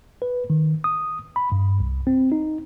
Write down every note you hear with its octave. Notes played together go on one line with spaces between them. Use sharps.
B4
D#3
D#6
B5
G2
C2
C4
D#4